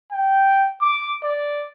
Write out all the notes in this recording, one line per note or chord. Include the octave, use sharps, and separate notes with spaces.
G5
D6
D5